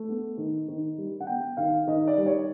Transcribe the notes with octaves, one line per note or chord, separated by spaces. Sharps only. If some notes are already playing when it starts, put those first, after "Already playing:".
Already playing: A3
B3
D#3
D#3
G3
F#5
B3 G5
D#3 F5
D#3 D#5
D5
G3
C#5